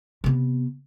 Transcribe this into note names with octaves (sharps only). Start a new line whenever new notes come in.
C3 B3